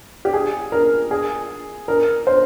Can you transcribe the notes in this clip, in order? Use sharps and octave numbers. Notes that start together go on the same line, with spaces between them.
G4
G#4
A#4
G#4
A#4
C5